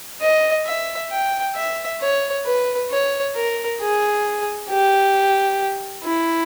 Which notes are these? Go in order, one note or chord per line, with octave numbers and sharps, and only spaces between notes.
D#5
E5
G5
E5
C#5
B4
C#5
A#4
G#4
G4
E4